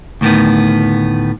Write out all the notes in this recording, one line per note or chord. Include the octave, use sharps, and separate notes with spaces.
D2 A2 D#3 B3